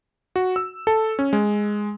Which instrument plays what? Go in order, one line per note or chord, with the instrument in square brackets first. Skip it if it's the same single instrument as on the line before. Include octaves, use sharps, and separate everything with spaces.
[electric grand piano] F#4
E6
A4
C#4
G#3